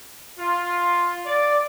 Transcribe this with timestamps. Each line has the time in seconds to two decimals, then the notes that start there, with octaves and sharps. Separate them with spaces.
0.38 F4
1.25 D5